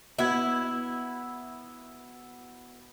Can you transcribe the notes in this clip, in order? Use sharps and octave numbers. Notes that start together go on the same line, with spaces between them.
B3 E4 F#4 G#6